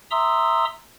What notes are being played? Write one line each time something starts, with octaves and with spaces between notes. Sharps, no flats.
E5 A#5 C6 D#6 E6